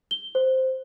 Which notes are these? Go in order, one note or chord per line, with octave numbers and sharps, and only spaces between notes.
G7
C5